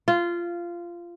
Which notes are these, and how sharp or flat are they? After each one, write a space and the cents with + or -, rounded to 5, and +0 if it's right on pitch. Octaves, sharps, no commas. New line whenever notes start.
F4 -15